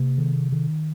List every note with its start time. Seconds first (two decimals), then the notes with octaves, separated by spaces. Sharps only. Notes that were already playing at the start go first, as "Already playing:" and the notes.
Already playing: C3 A#3
0.18 D#3
0.52 D#3